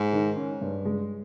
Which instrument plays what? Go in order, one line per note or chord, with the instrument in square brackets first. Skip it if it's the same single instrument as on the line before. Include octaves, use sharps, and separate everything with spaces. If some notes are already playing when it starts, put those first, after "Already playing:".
Already playing: [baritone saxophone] G#2
[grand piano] D#3
C#4
G2
G#3